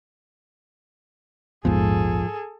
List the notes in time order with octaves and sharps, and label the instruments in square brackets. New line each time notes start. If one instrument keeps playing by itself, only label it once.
[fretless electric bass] A#1 E2 B3 [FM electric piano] G#2 [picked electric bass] F3 [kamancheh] G#4 A4